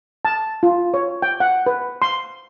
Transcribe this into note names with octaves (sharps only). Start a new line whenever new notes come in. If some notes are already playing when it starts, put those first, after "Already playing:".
A5
F4
C#5
G5
F#5
B4
C6